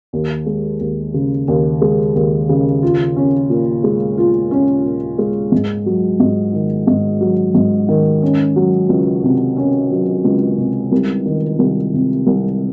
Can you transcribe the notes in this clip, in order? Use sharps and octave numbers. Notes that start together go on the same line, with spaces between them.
D#2
G#3
D#2
C#3
D#2
G#3
D#2
C#3
F4
C#4
A#2
G#3
F4
C#4
A#2
G#3
G#2
F#3
G#2
D#3
G#2
F#3
G#2
D#3
C#4
F#3
C#2
C3
C#4
F#3
C#2
C3
C2
D#3
C2
C3
C2